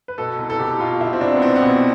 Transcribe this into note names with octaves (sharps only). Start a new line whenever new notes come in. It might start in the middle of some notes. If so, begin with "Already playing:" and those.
B4
B2 A4
C2
A4
C2 G4
B2 F4
B2 E4
C4
C2 D4
B3
C2 C4
B3
B2